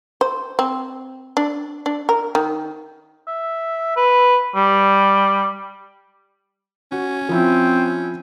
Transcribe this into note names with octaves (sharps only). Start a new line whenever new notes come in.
C5
C4
D4
D4
A#4
D#3
E5
B4
G3
C#4 F#4
F3 C4 E4